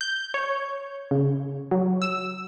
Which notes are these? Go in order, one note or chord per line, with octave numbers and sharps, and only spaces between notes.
G6
C#5
C#3
F#3
E6